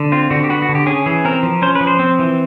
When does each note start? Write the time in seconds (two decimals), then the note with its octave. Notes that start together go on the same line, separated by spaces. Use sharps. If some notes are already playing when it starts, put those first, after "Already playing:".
Already playing: D3
0.12 C4 F4
0.31 D3 F#4
0.44 G4
0.50 B3 F#4
0.62 F#4
0.69 D3
0.75 G4
0.86 C#4 G#4
1.06 E3 G#4
1.25 C4 A#4
1.43 F3
1.62 C#4 C5
1.75 B4
1.81 F3
1.87 C5
1.99 C4
2.19 E3